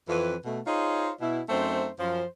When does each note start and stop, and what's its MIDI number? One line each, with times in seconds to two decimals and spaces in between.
0.09 0.35 41
0.09 0.35 52
0.09 0.35 71
0.45 0.59 47
0.45 0.59 57
0.66 1.11 63
0.66 1.11 65
0.66 1.11 68
0.66 1.11 72
0.66 1.11 73
0.66 1.11 75
1.21 1.41 47
1.21 1.41 64
1.49 1.88 42
1.49 1.88 57
1.49 1.88 60
1.49 1.88 63
1.49 1.88 72
1.99 2.23 42
1.99 2.23 53
1.99 2.23 72